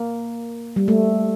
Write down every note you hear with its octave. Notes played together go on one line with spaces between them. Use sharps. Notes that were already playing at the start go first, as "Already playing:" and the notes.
Already playing: A#3
G3
A3